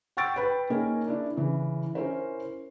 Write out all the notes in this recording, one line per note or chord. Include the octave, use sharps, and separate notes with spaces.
F#5 G5 C#6 E6 A6 D7
B4 G5 B5
A#3 C#4 D#4 G#4 A#4
D4 E4
C#3 E3
C#4 E4 A#4 C5